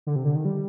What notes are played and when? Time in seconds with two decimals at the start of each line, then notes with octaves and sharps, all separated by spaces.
0.07 D3
0.16 C3
0.25 D3
0.35 D#3
0.45 G3